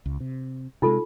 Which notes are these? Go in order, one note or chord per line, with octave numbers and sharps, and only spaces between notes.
C#2
C3
C3 G#3 D#4 F4 A4